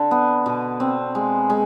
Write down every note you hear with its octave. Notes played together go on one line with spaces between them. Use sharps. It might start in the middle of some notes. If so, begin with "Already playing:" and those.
Already playing: D3
B3
B2
C4
G#3
G#3